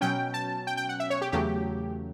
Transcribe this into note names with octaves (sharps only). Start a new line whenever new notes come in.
B2 F#3 C#4 G5
A5
G5
G5
F#5
E5
C#5
G4
E2 C#3 F#3 A3 G4